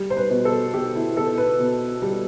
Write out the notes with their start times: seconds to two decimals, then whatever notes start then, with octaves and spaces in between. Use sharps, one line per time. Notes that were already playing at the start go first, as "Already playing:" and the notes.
Already playing: G3
0.10 C5
0.17 B4
0.31 B2
0.45 A4
0.73 B2 G4
0.96 E4
1.16 B2 A4
1.38 B4
1.60 B2
2.02 G3